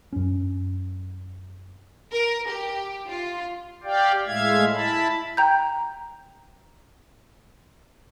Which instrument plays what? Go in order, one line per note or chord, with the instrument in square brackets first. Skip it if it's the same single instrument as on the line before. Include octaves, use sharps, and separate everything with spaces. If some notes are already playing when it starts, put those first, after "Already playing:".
[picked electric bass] F#2 C#4
[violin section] A#4
G4
F4
[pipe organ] G4 D5 F5 G5
A2 G#3 E5 F5 G#6
E4 A5 B5
[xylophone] G5 A#5 G6